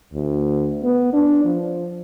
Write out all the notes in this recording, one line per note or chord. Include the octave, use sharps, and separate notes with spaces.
D2
B3
D4
F3